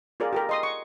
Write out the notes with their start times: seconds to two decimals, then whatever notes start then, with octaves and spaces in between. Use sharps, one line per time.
0.20 F4 G#4 A#4 D5
0.33 G4 A4 A#4
0.49 D#5 C6 D#6
0.63 C#6